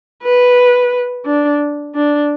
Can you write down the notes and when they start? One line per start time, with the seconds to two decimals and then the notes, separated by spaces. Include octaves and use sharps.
0.23 B4
1.25 D4
1.95 D4